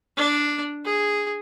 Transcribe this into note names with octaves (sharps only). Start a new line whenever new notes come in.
D4
G#4